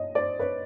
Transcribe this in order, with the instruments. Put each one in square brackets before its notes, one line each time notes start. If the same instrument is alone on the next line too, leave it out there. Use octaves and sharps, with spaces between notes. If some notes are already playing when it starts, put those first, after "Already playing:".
Already playing: [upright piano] C#5 D#5
C5 D5
B4 C#5